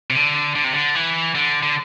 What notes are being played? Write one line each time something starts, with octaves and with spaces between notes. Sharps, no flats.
C3
D3
D3
C3
D3
E3
D3
D3